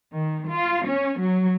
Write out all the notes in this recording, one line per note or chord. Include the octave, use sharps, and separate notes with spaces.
D#3
F4
C#4
F#3